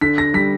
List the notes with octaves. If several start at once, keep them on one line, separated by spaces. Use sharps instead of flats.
D3 B6
A#6
G3 B6